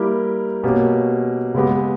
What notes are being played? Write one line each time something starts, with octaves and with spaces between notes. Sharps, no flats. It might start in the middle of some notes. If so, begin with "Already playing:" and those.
Already playing: G3 A#3 E4 G4 A#4
B2 A#3 C#4 G4
C#3 G#3 B3 G4